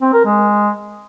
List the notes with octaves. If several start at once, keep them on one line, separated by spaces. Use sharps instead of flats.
C4
A#4
G#3